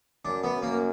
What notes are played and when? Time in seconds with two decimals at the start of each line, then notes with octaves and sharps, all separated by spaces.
0.25 F#2 D4
0.43 B3
0.53 F#2
0.62 A#3